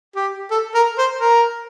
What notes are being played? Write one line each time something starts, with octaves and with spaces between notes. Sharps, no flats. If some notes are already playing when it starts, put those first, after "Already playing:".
G4
A4
A#4
C5
A#4